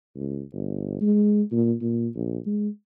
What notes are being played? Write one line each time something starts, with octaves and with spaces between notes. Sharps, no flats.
C#2
G1
G#3
A#2
A#2
A#1
G#3